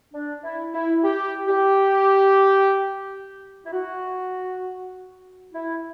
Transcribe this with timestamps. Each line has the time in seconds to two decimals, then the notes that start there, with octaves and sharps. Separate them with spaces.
0.13 D4
0.43 E4
0.73 E4
1.03 G4
1.48 G4
3.65 E4
3.73 F#4
5.54 E4